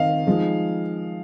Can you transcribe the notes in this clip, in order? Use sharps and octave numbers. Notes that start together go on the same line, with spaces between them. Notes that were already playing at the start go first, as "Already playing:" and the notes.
Already playing: D#3 C4 D#4 D#5 F5
F3 G#3 D#4